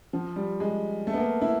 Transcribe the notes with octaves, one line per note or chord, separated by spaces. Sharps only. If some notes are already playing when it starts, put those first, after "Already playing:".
F3
G3
G#3
A3
B3
A#3
E4